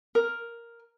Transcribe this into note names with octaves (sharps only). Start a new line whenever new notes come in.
A#4